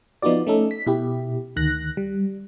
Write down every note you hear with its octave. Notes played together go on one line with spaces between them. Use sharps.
F3 B3 D#4 F4 F#4 D5
A3 C#4 D#4 A4
B6
B2 E4 G4
D2 D#3 F#6 A#6
G3